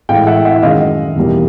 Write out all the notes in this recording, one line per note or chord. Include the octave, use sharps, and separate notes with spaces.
A2 E3 G#3 F5 G5
E5 F#5
E5 F#5
F#2 D#3 G#3 D#5 F5
E2 B2 G3 A#3